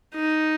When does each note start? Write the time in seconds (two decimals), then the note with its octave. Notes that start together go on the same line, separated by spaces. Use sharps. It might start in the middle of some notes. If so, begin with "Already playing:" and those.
0.15 D#4